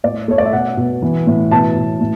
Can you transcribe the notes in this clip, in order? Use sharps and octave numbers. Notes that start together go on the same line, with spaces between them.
A2 D5
A3 C#5
D5
E5
B2 F#5
B2
E3
A2
B2 A5
B2
A2